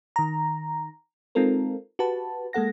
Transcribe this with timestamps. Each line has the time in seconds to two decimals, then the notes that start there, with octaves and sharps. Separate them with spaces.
0.16 D#3 A#5
1.35 G#3 C4 D#4 F4 A4 A#4
1.99 F#4 G4 B4 A5
2.53 G#3 A#3 A4 F#5 A#6